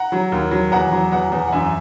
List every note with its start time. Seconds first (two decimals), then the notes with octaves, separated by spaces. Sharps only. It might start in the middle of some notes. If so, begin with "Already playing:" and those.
Already playing: F#5 A#5
0.12 F#3
0.32 D#2
0.51 F#3
0.71 E2 F#5 A#5
0.91 F#3
1.11 E2 F#5 A#5
1.32 E2
1.48 F#5
1.52 F#2 E5 G#5